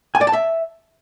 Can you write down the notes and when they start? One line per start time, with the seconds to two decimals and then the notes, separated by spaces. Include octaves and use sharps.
0.15 G#5
0.21 D5
0.27 A5
0.33 E5